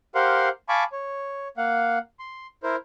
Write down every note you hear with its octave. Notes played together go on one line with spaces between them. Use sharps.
G4 A#4 C5 F5 F#5 C6
F5 G#5 A5 B5 C#6 D6
C#5
A#3 F5 F#5
C6
E4 A#4 C5